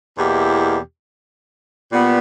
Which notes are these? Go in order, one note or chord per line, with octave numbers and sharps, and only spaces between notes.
E2 B2 A#3 E4 G4
A#2 G3 B3